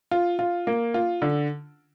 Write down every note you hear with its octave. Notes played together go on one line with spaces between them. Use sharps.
F4
F4
A#3
F4
D3